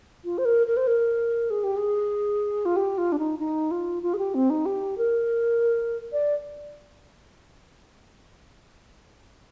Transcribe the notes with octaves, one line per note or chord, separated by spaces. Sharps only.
F4
C5
A#4
A#4
C5
A#4
G#4
G4
G#4
F4
G4
F4
D4
D#4
D#4
F4
F4
G#4
G4
C4
D#4
G4
A#4
D5